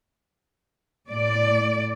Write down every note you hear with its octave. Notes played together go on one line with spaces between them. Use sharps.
A2 D5